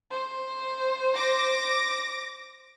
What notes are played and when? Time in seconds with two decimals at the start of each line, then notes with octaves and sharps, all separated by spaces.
0.11 C5
1.15 D6 A#6